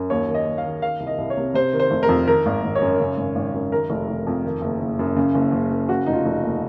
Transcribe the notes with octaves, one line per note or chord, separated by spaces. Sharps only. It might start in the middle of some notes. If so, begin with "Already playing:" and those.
Already playing: F#2
D#2 C#5
D#3
D#5
D#2
F5
D#3
D#3 F5
C2
D#5
C2
C#5
C3
C3 C5
D#3
C5
F1
A#4
F2
D#3 A#4
G#1
G#1
C#5
F#2
C#3
G#1
G#1
F#2
D#3 A#4
F1
F1
F2
D#3
F#1
F#1
F#2
C#3
F#1
F#1
F#2
C#3 F#4
F1 D#4
F4
F1
F4
D#2